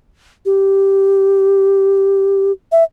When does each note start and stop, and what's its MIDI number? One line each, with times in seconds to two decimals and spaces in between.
0.45 2.52 67
2.72 2.84 76